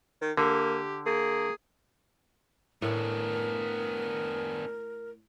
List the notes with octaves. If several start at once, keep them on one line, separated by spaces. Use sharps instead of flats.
D#3
D3 A#3 G4
A#3 G#4
A2 B3 D4 A#4